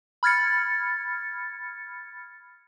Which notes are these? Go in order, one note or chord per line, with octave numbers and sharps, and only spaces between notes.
B5 F6 G#6 A6 C#7